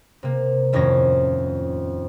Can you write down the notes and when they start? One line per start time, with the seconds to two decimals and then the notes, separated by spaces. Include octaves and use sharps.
0.23 C3 A#3
0.73 D#1 F2 A2 C#4 A#6